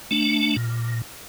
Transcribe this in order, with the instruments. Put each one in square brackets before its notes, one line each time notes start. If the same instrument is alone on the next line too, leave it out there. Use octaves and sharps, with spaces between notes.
[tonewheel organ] A3 D4
A#2